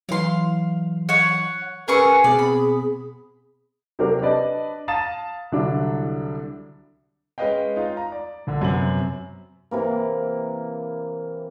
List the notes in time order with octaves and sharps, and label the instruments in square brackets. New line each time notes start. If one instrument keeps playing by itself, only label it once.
[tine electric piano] E3 F#3 [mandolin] F5 C6
[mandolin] C#5 F#5
[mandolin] C#4 G#4 C#6 [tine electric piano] A#4 B5 E6 [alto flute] B4
[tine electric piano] B2 B3 C4 [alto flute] G#4 [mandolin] D5
[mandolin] B5
[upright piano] C3 F#3 C4 D4 F#4 A#4
D4 B4 D5 D#5 A5
F5 A5 A#5 D#6 A6 E7
C2 D3 F#3 D4 E4
[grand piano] G#3 C#4 B4 D#5 F5 G5
D#4 F4
A#5
D5
A#1 D3
F#2 C3 B3 F#7
[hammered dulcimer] C3 E3 A#3